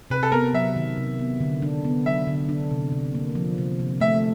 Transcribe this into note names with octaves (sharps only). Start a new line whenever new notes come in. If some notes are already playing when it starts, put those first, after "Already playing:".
C3 B4
A4
B3 A#4
F#3 E5
D#3
C3
B3
D3
D4
B3
F#3 E5
D3
D4
C3
C3
A#3
F3
C3
C3
A3 E5